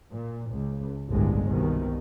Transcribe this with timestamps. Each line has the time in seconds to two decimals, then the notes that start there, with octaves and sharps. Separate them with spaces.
0.12 A#2
0.51 C#2
1.08 G1 C2 A2 D3 G#3
1.47 C2 B2 D#3